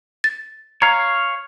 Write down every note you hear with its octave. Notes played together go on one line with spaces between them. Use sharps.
A6
C#5 F5 A#5